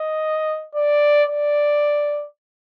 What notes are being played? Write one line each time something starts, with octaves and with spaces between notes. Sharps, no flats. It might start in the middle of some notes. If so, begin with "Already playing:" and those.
Already playing: D#5
D5
D5